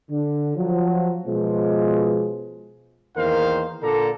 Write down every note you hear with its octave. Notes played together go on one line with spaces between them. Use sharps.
D3
F3 F#3
B2 F3 G#3
E2 D#3 A#3 A#4 C5 F5
A#2 D3 A#3 A4 D5 A#5